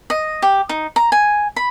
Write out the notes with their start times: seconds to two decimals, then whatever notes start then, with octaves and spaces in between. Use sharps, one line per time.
0.10 D#5
0.42 G4
0.69 D#4
0.96 A#5
1.12 G#5
1.56 B5